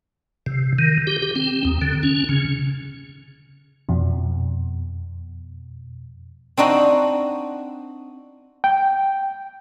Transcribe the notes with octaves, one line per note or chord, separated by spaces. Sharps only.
C3
D#3
G4
G4
C4
D#2
D3
C#4
C#3
F2 B2
C4 D4 D#4 F#4
G5